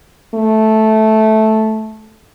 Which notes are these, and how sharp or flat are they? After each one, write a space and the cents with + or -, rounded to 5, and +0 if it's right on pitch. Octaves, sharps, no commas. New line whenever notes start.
A3 -10